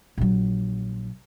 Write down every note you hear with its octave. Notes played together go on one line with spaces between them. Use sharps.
A#1 F#3